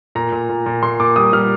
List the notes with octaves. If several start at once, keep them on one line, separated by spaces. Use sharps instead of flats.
A#2 A#5
A#2
A#2
A#2
A#2 C6
A#2 D6
G3 D#6
G3 F6